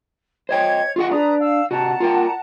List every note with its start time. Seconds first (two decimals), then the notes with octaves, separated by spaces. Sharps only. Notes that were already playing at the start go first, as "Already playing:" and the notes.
0.49 C5 C#5 D#5 G5 G#6
0.96 F4 G#4 D#5 F#5 C#6
1.11 D4 B4 A#5 D#6
1.40 F5 E6
1.71 C3 F#4 F#5 A5 A#5
2.00 F4 A#4 G5